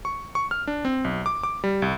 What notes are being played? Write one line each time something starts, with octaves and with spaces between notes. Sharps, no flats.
C#6
C#6
F6
D4
C4
B1
D6
D6
G3
C2